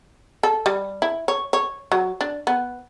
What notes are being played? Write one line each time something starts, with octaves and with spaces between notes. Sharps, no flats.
A4
G3
E4
C#5
C#5
F#3
D4
B3